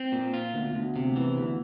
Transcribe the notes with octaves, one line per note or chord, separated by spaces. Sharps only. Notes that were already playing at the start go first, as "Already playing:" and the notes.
Already playing: C4
A#2
F4
D2 B3
D2
C3
E3
D2